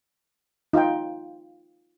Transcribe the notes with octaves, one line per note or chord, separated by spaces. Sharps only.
D#4 F4 F5 G5